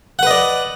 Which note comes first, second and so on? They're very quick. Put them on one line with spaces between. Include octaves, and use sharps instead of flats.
F#5 B4 D#5 D5